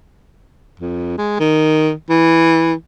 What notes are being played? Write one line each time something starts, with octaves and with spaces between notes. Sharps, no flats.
F2
G#3
D#3
E3